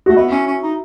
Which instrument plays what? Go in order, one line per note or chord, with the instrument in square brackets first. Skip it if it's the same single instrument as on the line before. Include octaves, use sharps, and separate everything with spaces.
[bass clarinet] A3 [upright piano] F#4
[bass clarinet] B3 [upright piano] E4
[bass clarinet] C#4
C#4
D#4